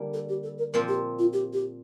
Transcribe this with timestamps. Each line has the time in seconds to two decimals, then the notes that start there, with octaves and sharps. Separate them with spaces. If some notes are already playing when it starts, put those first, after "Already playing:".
Already playing: D3 G3 A#3
0.14 A4
0.29 G4
0.43 A4
0.58 A#4
0.73 A#2 F3 C4 A#4
0.88 G4
1.19 F4
1.33 G4
1.53 G4